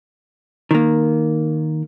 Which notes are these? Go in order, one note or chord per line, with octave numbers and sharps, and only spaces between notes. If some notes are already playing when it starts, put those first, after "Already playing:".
D#3 A#3